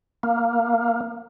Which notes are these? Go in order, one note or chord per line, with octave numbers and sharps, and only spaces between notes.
A#3